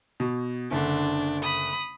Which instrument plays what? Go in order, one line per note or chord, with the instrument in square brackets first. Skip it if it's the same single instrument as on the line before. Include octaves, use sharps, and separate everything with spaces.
[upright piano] B2
[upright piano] F#1 D3 [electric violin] D4
[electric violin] B5 D#6